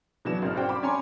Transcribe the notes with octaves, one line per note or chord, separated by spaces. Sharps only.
B2 E3 F#3 D5 E7
G#1 C#3 F6
F#4 C5 D5 G5
B5 D6
C#4 C#5 D5 G#5 A#5 C6